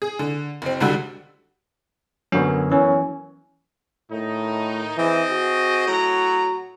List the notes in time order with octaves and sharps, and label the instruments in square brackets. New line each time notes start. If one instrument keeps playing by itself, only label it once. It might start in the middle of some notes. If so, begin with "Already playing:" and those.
[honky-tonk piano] G#4
D3
F#1 C4
C#2 D3 G3 F#4 E6
[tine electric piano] F#2 D3 C#4 [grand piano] F#3 A#3 B3
[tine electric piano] E3 [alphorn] C#4
[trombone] A2 [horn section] D#3 D#4
[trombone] E3 [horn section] C4 G#4 D#5
[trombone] F#4
[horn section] A2 F#3 A#5